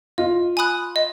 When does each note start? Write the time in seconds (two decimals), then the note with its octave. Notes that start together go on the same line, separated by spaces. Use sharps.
0.18 F4 D#5
0.57 G#5 B5 D#6 F#6
0.96 D#5